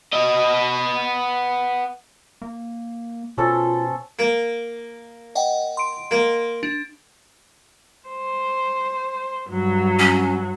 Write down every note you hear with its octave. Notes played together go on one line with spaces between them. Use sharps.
B3 D#5
A#3
B2 C#4 F4 A4 C5
A#3
D#5 F#5 G5
C6 D7
A#3
D4
C5
G2 F#3
C#4